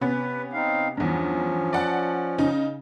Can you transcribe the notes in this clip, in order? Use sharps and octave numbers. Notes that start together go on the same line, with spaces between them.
C3 B3 C#4 B4
C4 D#4 F5
E2 G2 F3 C#4
D5 F#5 A5
C#3 D#4